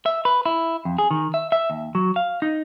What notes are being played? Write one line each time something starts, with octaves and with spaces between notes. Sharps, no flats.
E5
B4
E4
F2
G#4
D#3
E5
E5
D#2
F#3
F5
D#4